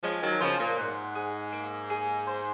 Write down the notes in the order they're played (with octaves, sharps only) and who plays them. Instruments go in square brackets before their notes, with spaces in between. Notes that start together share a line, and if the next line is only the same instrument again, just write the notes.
[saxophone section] F3 G#3 [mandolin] C#4
[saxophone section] D#3 F#3
[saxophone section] C#3 F3 [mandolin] C5
[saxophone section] A#2
[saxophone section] G#2 [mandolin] F#5
[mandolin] G#4
A#3
G#4
C5